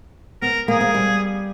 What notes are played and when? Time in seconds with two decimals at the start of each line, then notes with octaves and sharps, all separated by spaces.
0.42 B3 A#4
0.68 A#3 G#4
0.81 A#3
0.94 G3